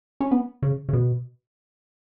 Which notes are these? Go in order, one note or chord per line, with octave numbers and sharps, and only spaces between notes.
C#4
B3
C#3
C#3
B2